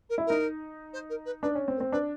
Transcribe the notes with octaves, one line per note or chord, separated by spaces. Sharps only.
A#4
E4
D#4 A#4
C5
A#4
B4
D4 B4
C#4
C4
A#4
C4
D4 B4